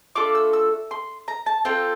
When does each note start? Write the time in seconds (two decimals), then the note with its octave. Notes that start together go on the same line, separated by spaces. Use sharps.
0.16 A3 D4 F4 A4 D6
0.35 E6
0.53 E6
0.91 C6
1.28 A#5
1.46 A5
1.65 C4 F4 A4 G5